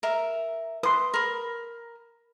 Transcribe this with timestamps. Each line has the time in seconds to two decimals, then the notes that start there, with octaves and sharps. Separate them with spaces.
0.03 A#4 E5
0.83 B4 C6 D#6
1.14 A#4 B5